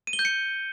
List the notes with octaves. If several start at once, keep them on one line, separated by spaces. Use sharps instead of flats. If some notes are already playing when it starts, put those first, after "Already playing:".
D#7
G7
G6
C#7